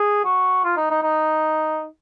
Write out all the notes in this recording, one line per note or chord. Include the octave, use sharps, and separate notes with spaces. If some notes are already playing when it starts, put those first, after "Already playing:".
Already playing: G#4
F#4
F4
D#4
D#4
D#4